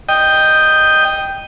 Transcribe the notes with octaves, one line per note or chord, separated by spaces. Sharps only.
D#5 G5